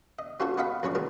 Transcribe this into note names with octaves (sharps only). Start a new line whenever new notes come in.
D#5
C#4 F4 F#4 A4 C5 C#5
B3 B4 D#5 F5 F#5 B5
F2 F#3 C#4 C#5 D5
D#3 G#3 A#4